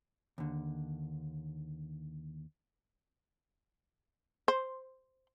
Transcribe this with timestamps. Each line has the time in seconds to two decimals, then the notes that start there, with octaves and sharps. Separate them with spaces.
0.38 D#2 D3
4.48 C5